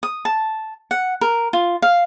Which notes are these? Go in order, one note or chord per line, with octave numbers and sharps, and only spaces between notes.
D#6
A5
F#5
A#4
F4
F5